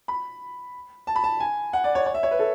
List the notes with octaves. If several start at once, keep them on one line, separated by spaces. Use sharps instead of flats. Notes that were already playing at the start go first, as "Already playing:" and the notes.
B5
A5
B5
A5
G#5
F#5
D5
C#5
C#5
E5
C#5
B4
A4